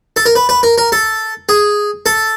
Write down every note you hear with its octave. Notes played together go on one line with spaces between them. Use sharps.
A4
A#4
B4
B4
A#4
A#4
A4
G#4
A4